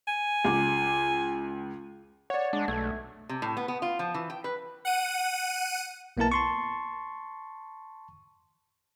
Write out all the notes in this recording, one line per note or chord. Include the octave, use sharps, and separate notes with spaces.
G#5
C#2 D6
C#5 D5 F#5
G#3 D4
B1 A3 G#6
C3
A2
B3
B3
F4
F3
E3
G5
B4
F#5 D#7
B1 A#3 B3 E4 A#4 A5
A5 C6 C#6